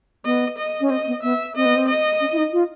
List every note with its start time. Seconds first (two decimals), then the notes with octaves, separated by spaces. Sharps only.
0.25 B3 D#5
0.58 D#5
0.81 C#4
0.90 C4 D#5
1.07 B3
1.23 B3 E5
1.56 C4 D#5
1.66 B3
1.76 C4
1.88 D#5
2.21 C#4
2.32 E4
2.38 D#4
2.53 F4